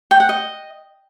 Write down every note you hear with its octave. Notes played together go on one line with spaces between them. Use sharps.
G5
F#5
D#5